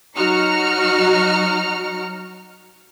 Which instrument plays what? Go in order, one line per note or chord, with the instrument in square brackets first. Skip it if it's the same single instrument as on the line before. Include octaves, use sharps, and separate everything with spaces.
[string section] F#3 D#4 F#4 A#5 F6 C#7